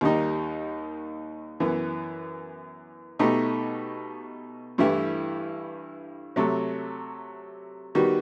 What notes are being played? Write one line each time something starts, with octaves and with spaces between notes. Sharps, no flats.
D#2 D#3 G3 D#4
F#2 E3 B3
B2 A3 D#4 G4
G2 E3 A3 E4 G4
C3 F#3 A3
D#3 G3 B3 F#4